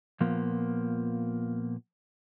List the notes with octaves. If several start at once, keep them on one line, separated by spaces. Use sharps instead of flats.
A#2 F3 A#3 B3